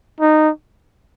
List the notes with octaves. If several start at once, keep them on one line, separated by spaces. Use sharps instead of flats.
D#4